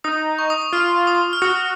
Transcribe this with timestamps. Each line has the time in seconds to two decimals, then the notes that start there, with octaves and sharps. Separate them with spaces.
0.04 D#4 D#6
0.39 C#6
0.50 D#6
0.62 D#6
0.73 F4 F6
1.07 D#6
1.33 F6
1.42 F#4 D#6